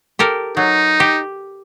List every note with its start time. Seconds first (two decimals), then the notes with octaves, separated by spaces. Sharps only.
0.19 G4 A4 A#4
0.57 F#3 D#4
1.00 G4